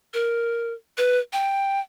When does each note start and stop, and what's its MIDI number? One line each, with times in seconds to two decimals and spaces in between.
0.14 0.73 70
0.98 1.19 71
1.33 1.80 79